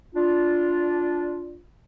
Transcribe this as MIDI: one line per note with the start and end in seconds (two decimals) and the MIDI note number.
0.15 1.59 62
0.15 1.59 65